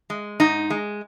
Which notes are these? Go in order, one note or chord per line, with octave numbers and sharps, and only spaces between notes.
G#3
G#2 D#4
G#3